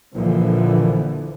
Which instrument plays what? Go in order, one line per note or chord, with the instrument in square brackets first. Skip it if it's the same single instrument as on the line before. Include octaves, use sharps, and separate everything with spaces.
[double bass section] A#1 A#2 D3 E3 F3